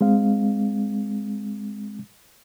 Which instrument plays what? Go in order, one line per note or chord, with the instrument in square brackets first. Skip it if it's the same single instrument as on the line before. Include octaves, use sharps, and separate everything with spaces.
[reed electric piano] G#3 C4 F5